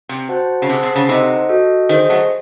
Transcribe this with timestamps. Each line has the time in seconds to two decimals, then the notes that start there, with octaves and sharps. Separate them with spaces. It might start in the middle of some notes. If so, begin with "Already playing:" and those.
0.09 C3
0.28 F#4 C5 F#5 A5
0.62 C#3
0.69 C3 G#4 C5 F#5 A5
0.83 C3
0.96 C#3
1.09 C3 D#4 A4 C5 D#5 F#5
1.49 F#4 A4 D#5
1.89 D#3 G#4 C5 D#5
2.10 F#3 A3